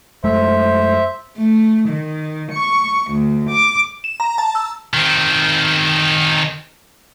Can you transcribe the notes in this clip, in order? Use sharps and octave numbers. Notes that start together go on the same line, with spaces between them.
F#2 G#3 A3 C5 E5
A3
D#3
C#6
D2
D6
E7
A#5
A5
E6
D#3 C4